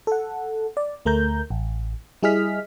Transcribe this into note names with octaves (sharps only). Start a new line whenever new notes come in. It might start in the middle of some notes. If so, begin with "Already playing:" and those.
A4 F#5
D5
D2 A3 A#4 A#5 G6
A1
G3 E4 G#4 D#5 F6 B6